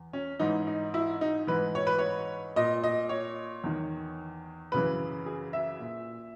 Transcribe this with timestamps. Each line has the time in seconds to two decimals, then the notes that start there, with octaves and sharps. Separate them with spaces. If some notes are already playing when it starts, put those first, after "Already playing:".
Already playing: E2
0.13 C#4
0.39 G#2 E3 D#4
0.67 D#4
0.94 E4
1.21 D#4
1.47 G#2 E3 B4
1.75 C#5
1.87 B4
1.99 C#5
2.56 A#2 D#5
2.83 D#5
3.09 C#5
3.64 E2 D#3
4.72 F#2 C#3 E3 B4
5.26 G#4
5.53 E5
5.79 A#2